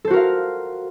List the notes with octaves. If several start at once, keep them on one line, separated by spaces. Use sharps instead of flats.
F#4 A4 A#4 C5 F5